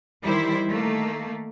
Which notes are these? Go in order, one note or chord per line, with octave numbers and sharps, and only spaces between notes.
D#3 E3 G3 E4 C5
D#3 A3 A#3